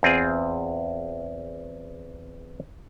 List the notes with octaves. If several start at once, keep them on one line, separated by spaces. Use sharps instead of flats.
E2 C4 F4 G#4